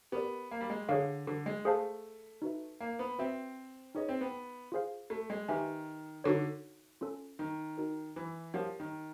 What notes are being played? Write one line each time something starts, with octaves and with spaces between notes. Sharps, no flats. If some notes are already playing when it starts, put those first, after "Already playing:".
B3 G4 A#4 D5
A#3
G3
G#3
D3 G#4 C#5 F5
D3
G#3
A3 G#4 C5 F5 A5
D#4 F#4 B4 E5
A#3
B3
C4 F#4 B4 E5
C#4 D#4 G#4 B4 D#5
C4
B3
F4 G#4 C5 F5
A3
G#3
D#3 G4 B4 E5 G#5
D3 D#4 F#4 A4 C#5
C#4 F4 A4
D#3
D#4 F#4 A#4
E3
F3 G4 A#4 C#5 F#5
D#3